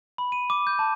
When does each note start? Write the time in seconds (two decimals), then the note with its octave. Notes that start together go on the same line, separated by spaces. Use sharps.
0.18 B5
0.32 D#7
0.50 D6
0.67 G6
0.79 A5